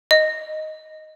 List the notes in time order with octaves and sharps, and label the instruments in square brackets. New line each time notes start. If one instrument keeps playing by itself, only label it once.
[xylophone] D#5